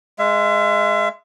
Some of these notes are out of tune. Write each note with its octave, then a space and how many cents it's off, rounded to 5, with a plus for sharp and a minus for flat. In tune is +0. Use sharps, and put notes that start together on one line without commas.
G#3 +0 E5 +35